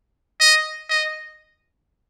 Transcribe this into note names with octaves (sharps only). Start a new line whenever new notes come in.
D#5
D#5